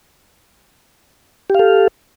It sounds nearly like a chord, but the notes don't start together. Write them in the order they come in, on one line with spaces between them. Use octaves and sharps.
G4 F5 A4